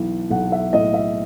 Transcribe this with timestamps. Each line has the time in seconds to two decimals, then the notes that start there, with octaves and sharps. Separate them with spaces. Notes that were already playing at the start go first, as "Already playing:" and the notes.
Already playing: B1 E3
0.30 B1 F#5
0.52 E5
0.73 A2 D#5
0.94 E5